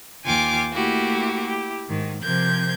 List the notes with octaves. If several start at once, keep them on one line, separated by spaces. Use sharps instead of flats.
D#2 F4 G5 G#5 D6 F6
A3 A#3 E4 F#4 G4
E4 G4
G#2 D#3
C3 F3 A#4 G6 G#6